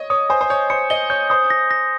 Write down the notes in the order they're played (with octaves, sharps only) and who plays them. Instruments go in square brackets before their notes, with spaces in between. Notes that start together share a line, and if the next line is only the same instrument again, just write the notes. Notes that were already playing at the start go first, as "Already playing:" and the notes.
Already playing: [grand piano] C#5 D#5
[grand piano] C#5 [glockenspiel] D#6
[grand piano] C5 [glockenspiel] G#5
[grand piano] C5
[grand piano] C#5 [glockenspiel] G6
[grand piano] C5 [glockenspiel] C#7
[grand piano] D#5 [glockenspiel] G7
[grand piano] C#5 [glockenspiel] G6
[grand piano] C5 [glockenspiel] D#6
[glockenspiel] A#6
A#6